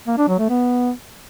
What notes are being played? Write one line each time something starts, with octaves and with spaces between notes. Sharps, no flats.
A#3
D4
F#3
A3
B3